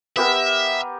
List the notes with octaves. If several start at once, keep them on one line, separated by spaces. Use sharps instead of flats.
B3 G4 A#4 E5